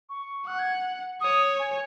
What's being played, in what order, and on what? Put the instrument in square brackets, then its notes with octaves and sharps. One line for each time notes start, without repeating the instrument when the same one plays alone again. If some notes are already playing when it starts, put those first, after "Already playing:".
[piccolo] C#6
[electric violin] F#5 [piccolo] F#6
[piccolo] G#6
[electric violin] C#5 [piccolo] D#6
[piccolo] G#5